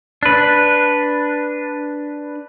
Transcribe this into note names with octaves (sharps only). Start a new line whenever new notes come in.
D4 B4